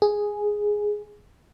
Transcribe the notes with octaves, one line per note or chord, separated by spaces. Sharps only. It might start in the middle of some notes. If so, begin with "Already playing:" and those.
G#4